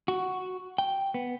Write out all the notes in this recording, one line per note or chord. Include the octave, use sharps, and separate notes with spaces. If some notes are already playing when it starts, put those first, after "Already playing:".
F#4
G5
B3